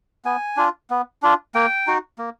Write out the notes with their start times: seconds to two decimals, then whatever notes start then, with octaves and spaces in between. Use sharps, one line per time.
0.25 B3 G#5
0.57 D4 F4
0.90 B3
1.23 D4 F4
1.55 A#3 G5
1.87 D#4 F#4
2.18 A#3